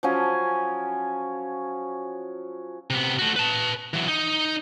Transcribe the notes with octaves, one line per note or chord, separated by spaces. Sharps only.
F3 F#3 C#4 G#5
C3 B3
A3 F#4
B4 A5
E3 F#3
D#4